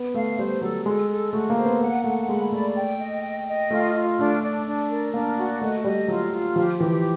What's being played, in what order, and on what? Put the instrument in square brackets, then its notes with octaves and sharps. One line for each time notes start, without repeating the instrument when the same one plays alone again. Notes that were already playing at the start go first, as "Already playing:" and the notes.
Already playing: [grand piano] B3
[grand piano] A3 [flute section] F5
[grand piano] G3 [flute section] C5
[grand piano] F#3 [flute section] A4
[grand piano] G#3 [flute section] A4
[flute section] A4
[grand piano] A3 [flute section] F#4
[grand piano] A#3
[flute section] C5
[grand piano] B3
[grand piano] A#3 [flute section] F#5
[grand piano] A3 [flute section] F#5
[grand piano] G#3 [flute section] B5
[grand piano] A3 [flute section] D5
[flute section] G5
D#5
G5
D#5
[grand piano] A3 [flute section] F4
[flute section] F4
[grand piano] A3 [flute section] D4
[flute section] D4
D4
A#4
[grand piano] A#3 [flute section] D4
[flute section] F#4
[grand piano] A3 [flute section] D#5
[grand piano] G3 [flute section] D#5
[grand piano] F#3 [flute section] F4
[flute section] F4
[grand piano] F3 [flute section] G4
[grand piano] E3 [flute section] G4